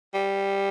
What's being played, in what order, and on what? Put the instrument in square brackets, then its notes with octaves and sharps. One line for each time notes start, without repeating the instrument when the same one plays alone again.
[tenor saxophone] G3